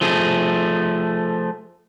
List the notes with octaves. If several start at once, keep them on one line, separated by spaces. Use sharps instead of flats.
F3 A3 G#4